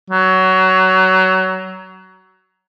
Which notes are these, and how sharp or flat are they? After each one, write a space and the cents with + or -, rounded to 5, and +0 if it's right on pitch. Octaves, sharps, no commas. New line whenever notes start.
F#3 +20